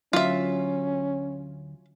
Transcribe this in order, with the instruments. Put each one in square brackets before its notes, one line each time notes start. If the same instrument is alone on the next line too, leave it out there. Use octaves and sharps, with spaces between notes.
[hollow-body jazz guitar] D2 F#3 [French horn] C#4 [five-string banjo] F4 E5